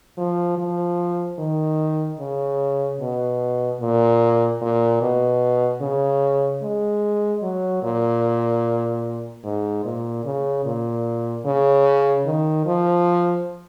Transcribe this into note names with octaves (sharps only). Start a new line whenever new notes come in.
F3
F3
D#3
C#3
B2
A#2
A#2
B2
C#3
G#3
F#3
A#2
G#2
A#2
C#3
A#2
C#3
D#3
F3